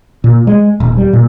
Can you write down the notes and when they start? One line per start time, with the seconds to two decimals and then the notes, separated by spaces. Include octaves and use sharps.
0.24 A#2
0.47 G#3
0.80 D#1
0.97 G3
1.13 A#2